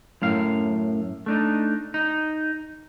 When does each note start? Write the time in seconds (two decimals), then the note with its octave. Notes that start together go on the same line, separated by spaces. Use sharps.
0.22 F#2 A2 F5
1.26 A3 D4 D#4
1.94 D#4